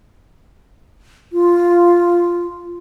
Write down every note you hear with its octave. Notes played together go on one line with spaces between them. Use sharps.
F4